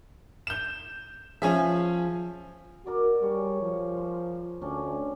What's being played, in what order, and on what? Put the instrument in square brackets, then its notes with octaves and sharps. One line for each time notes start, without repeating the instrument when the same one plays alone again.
[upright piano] G6 E7
[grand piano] F3 [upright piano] C#4 G#4 E5
[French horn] F#4 [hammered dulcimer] A#4 D5 D6
[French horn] G3 [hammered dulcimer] G#4 C#5
[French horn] F3
[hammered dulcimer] C5
[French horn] D2 [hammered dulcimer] C#4 D4 G5